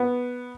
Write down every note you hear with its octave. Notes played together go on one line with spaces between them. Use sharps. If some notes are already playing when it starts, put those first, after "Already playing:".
Already playing: B3